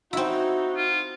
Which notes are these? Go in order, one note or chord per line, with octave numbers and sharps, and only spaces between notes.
C4 D#4 E4 F#4
F4